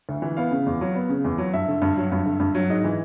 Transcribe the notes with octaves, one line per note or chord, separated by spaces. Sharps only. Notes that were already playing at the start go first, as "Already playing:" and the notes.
D2
E3
B3 F5
C#3
E2
F#3
B3
C#3
E2
F#3
G2 E5
D3
G2
F#3
G2
D3
G2
F#3
G#2 D#5
E3